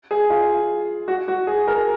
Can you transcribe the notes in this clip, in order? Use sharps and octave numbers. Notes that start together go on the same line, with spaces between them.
G#4
F4
F#4
F#4
G#4
A#4